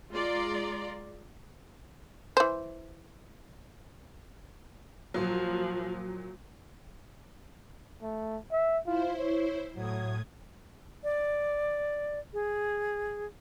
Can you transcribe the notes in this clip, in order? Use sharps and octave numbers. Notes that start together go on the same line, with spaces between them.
G#3 F4 D5 A#5 C6
E3 C5
A#2 F3 F#3
A3
E5
E4 F4 C5
C#5
A2 F#3 D#6 G#6
D5
G#4